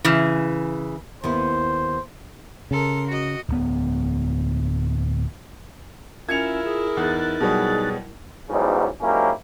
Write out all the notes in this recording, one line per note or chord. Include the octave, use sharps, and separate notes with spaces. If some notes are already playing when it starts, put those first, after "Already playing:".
C#3 E3
D#2 B3 E4 C5
C#3 A4 A#4 C6
F#4 D#5
D1 B3
C#4 E4 F4 A#4 E5 G#6 C#7 F7
G#4
E2 D#4 F#6 A6
B2 F#3 G3 G#4
B1 E2 G#2 C#3 F#3 G3
G#2 F#3 A#3 C#4 E4 G4